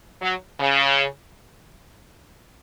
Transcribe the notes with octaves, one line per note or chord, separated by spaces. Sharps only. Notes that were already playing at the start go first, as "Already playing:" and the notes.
F#3
C#3